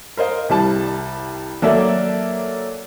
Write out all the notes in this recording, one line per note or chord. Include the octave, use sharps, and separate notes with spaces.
A#4 C5 D#5 F5
C2 G3 A5
F#3 A#3 A4 A#4 D5 E5